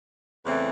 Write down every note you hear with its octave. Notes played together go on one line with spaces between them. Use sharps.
E2 C#3 E3 A3 C4